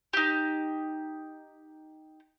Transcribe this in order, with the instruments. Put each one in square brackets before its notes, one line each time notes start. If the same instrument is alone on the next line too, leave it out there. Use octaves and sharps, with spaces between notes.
[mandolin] D#4 G4